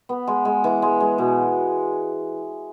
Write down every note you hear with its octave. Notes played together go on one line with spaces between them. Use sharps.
B3
G#3
G#3
E3
G#3
G#3
B2